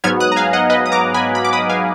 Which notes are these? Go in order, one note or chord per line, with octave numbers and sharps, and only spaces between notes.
G#2 F#3 B3 F6 G#6
D#6 F#6
A#5
F5 G#5
D#5 F#5
B4 D#5
D#6
A#5 D6
G#5 B5
B5
D6
B5 D#6
F5 G#5